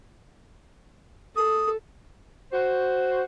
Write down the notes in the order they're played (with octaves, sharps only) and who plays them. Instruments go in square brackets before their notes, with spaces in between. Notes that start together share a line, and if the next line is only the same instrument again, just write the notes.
[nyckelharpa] A4 [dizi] D#6
[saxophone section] F#4 C5